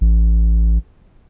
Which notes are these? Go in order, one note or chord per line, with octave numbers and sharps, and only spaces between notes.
A1